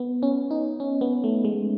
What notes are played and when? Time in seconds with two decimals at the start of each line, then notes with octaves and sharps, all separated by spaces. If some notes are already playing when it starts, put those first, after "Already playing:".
Already playing: B3
0.23 C#4
0.51 D#4
0.80 C#4
1.01 B3
1.24 A3
1.44 G#3